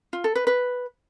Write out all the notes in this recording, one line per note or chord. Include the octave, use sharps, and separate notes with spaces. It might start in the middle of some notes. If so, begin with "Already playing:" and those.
F4
A4
B4
B4